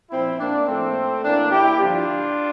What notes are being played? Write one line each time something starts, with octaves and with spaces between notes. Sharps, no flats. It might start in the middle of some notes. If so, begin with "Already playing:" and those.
A#2 F3 C4 E4
A#3 D4
A2 F3 A3 C4
A2 E3 A#3 D4
E4 G4
G2 D3 F3 D4 F4